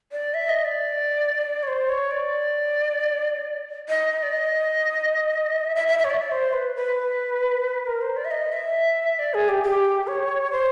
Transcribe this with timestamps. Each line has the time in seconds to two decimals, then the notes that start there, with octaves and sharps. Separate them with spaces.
0.12 D5
0.34 E5
0.49 D#5
0.64 D5
1.63 C#5
1.68 C5
1.89 C#5
2.11 D5
3.89 D#5
4.23 D5
4.33 D#5
5.65 E5
5.76 E5
5.88 E5
5.99 E5
6.04 C#5
6.10 D5
6.31 C5
6.53 B4
6.75 B4
7.87 A#4
8.01 C5
8.17 D5
8.25 E5
8.31 D#5
8.52 E5
9.19 D5
9.34 G#4
9.49 G4
9.63 G4
10.07 C#5
10.52 C5